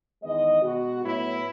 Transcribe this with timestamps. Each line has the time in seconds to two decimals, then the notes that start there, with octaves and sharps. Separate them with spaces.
0.22 E2 D#3 G#3 B3 D#5
0.62 B2 G#3 B3 F#4
1.02 A2 F#3 B3 E4